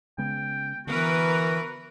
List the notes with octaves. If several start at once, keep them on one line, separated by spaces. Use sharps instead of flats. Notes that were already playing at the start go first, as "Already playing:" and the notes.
C#3 G#3 B3 G5
D3 E3 B3 F#4 A#4 B4